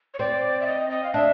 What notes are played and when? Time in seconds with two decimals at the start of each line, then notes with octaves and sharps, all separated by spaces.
0.14 C#5
0.19 C4 D5
0.61 E5
0.66 D#5
0.90 D#5
1.04 F5
1.14 D4 E5